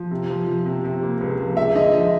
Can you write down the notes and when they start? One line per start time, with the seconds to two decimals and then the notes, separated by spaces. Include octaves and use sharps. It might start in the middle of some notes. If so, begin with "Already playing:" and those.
Already playing: F3
0.11 C3
0.29 F3
0.47 F3
0.66 C3
0.85 C3
1.02 A#3
1.21 C#2
1.39 F3
1.57 G#3 E5
1.75 D3 D#5
1.93 F3 D#5